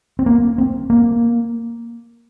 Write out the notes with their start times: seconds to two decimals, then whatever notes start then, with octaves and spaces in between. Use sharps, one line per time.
0.19 C4
0.26 A#3
0.58 C4
0.90 A#3